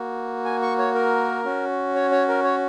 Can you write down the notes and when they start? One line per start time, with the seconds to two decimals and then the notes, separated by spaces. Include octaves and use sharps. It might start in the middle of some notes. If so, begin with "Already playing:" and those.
Already playing: A#3 F#4
0.45 G#5
0.62 C#6
0.78 C#5
0.95 A#4
1.45 C#4 F#4
1.95 C#5
2.12 C#5
2.28 A#4
2.44 C#5